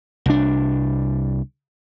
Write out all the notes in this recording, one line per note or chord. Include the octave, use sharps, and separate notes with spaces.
C2 D4